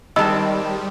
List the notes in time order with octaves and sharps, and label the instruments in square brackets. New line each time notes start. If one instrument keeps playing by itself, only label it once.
[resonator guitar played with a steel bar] D#3 G#3 C4 [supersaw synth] G3 [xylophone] D#5 E6 [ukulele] A5 B5